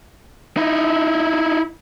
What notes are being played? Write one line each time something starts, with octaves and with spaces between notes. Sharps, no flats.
D#4 E4